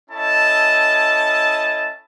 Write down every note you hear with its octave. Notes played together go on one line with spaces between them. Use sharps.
C#4 E4 A4 D#5 A5